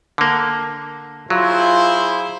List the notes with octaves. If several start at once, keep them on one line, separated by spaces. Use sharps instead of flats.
D3 A#3
F#3 E4 F4 G#4 C5